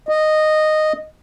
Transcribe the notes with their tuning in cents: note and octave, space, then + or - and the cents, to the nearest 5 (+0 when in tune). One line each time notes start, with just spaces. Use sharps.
D#5 -10